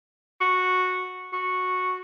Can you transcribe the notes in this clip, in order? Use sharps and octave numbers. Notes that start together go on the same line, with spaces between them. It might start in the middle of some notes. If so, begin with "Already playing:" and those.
F#4
F#4